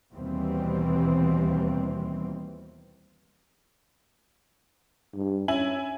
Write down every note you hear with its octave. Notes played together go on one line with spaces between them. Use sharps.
D#2 B2 E3 G3 C4
G2
C#4 E4 G#5 F#7